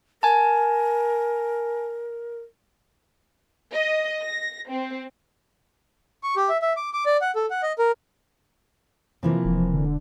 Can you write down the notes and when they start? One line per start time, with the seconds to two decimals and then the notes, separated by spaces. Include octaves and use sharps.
0.23 A#4 G#5 A5
3.73 D#5
4.22 A#6
4.70 C4
6.23 C#6
6.36 G4
6.49 E5
6.62 E5
6.77 D6
6.93 D6
7.06 D5
7.21 F#5
7.35 A4
7.51 F#5
7.63 D#5
7.79 A#4
9.23 C3 E3 F3 A#3
9.44 E1
9.74 D3